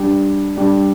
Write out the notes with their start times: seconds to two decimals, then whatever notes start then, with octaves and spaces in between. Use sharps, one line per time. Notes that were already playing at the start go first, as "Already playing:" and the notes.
Already playing: G3 D4 G4
0.57 G3 D4 G4